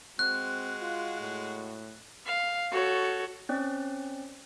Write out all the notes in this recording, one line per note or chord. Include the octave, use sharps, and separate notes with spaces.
G#3 C4 F#4 F#6
F4
A2
F5
F#4 A4 C#5
C4 C#4 D5